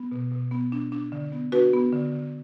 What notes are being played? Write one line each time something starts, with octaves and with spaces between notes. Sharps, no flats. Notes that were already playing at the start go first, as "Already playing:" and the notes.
Already playing: B3
B2
B2
B3
D4
D4
D3
B3
D4 F#4 B4
B3
D3
D3